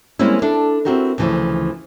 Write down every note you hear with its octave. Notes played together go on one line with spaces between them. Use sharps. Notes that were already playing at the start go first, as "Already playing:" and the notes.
G3 G#3 A#3 C4 C#4 E4
D4 E4 A4 D5
C4 D4 E4 F#4 G4 A#4
D2 C#3 E3 F3